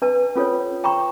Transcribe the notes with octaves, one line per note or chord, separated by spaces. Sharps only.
D4 B4 A5
C#4 F4 A4 C5 C#5
G5 A#5 B5 C#6